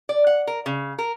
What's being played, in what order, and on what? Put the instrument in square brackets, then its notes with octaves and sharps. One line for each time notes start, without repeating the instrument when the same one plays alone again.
[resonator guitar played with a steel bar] D5
F#5
A#4
C#3
A#4